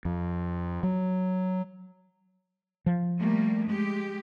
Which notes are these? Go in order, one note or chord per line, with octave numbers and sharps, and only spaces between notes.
F2
F#3
F3
G3 A3 A#3
G#3 G4